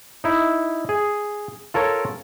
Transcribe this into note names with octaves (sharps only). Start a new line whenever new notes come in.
D#4 E4
G#4
F4 A4 A#4 C#5